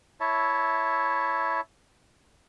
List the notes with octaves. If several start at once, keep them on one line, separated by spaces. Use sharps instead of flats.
E4 C#5 E5 A5